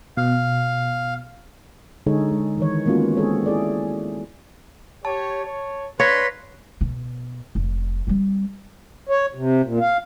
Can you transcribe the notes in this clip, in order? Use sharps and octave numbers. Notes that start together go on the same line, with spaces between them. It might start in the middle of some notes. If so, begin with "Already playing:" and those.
B2 F5
D3 G#3 D#4 G#4 A4 C#5
G#3
D#3 E3 C#5
G#3 A#3 B3 C#4 F4 F#4
G#3 C4 G#4 A4 C#5
E4 G#4 A4 D5
G4 C#5 A5
C#5
D4 B4 C#5 F5 C6 A#6 B6
B2
F1
G3 C4
C#5
C3
A#2
F5